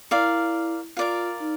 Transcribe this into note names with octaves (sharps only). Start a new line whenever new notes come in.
E4 A#4 D5 F5
F4 A#4 D5 F5
D#4